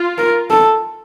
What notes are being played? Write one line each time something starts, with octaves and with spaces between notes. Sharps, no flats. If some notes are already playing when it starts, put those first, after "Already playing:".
Already playing: F4
A#4
A4